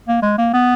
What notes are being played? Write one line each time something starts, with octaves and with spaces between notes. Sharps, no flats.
A#3
G#3
A#3
B3